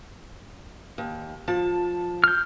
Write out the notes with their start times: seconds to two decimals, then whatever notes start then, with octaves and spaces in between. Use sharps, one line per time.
0.98 D#2
1.48 F3 A5
2.24 F6 G6